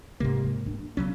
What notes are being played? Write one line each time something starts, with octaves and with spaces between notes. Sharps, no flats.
G#2 C3 E3 A#3
F3
D4
B1 C#3 F#3 C#4